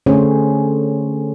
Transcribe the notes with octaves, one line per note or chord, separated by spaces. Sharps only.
D3 A3 C#4 G#4 C5 C#5